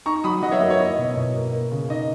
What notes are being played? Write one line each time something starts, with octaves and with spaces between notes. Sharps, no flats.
D#4 A#5 C#6
F#3 B5 D#6
F#3 D#5 F#5
C#5 E5
A#3 D#5
C#5
E4 D#5
B2
B2
A#3
A#3
C#3
D#4 D#5